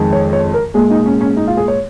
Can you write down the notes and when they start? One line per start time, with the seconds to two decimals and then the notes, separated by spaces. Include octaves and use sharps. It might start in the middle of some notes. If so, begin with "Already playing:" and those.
Already playing: F2 D#3 G#3
0.13 C#5
0.33 C#5
0.54 A#4
0.74 A#2 G#3 G#4
0.90 D#4
1.06 C#4
1.21 C#4
1.37 D#4
1.47 F4
1.57 G#4
1.68 C#5